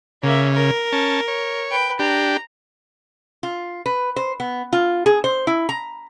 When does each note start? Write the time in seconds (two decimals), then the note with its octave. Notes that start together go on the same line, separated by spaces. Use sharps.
0.23 C#3 A#3 E5
0.54 A#4
0.93 C#4 A5
1.28 C#5
1.71 B4 G5
1.99 D4 G4 A#5
3.43 F4
3.86 B4
4.16 C5
4.40 B3
4.73 F4
5.06 G#4
5.24 C5
5.47 E4
5.69 A#5